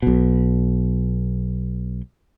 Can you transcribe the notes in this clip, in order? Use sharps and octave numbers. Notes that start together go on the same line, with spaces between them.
B1 B2